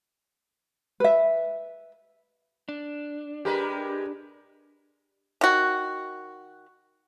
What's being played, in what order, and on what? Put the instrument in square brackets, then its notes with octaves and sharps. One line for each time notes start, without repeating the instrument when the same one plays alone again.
[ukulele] B4 E5
[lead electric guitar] D4
[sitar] G#3 A#4 B4 [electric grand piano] G4
[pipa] D#3 F#4